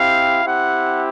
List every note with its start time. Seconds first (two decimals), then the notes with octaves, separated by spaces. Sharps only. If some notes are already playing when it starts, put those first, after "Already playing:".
Already playing: C4 E4 G4 F5
0.45 C4 E4 G4 F#5